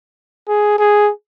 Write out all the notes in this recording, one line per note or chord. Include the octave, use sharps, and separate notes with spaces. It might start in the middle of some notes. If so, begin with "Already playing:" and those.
G#4
G#4